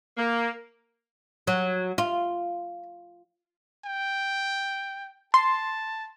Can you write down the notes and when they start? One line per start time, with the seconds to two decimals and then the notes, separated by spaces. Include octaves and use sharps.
0.17 A#3
1.47 F#3
1.98 F4
3.85 G5
5.34 A5 C6